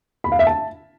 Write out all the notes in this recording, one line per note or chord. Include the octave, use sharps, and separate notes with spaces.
B5
F5
E5
A5